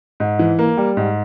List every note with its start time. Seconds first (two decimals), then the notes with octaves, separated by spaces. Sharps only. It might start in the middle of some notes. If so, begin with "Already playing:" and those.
0.20 G#2
0.39 E3
0.59 A#3
0.77 G3
0.97 G#2